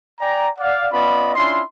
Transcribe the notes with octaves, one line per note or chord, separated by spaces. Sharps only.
D5 G5 G#5 A#5
D5 F5 F#5
B3 C#4 F4 D5 D#5 B5
C#4 D4 E4 F4 C6